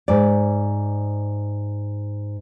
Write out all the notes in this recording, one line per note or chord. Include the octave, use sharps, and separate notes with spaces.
G#2 D5